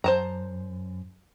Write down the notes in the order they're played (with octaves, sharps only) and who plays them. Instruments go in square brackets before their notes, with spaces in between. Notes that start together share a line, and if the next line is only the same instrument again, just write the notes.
[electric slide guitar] F#2 [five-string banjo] C5 A5 A#5